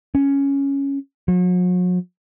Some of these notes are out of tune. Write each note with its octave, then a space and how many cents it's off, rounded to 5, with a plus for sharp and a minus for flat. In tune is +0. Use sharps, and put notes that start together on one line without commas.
C#4 +0
F#3 -45